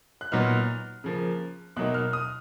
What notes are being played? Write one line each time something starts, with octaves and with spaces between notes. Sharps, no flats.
F#6
A#2 F#3 B3 D#4 F6
C#3 F3 A#3
B2 F#3 A#3 D#4 F#6
F6
D#6